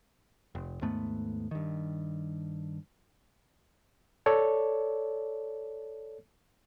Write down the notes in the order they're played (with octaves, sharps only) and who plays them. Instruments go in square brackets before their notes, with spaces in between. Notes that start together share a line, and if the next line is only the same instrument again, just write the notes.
[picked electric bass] F1
D#2 G#2 A3 B3
G2 D#3
[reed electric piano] A4 C#5 D5